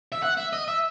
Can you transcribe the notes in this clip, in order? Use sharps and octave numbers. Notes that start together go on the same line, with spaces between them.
E5
F#5
E5
D#5
E5